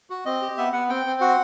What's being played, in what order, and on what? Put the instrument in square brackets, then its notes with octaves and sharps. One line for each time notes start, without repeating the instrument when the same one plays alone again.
[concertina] F#4
C4 D#5
G4
B3 E5
B3 F#5
C4 G5
C4
F#4 F#5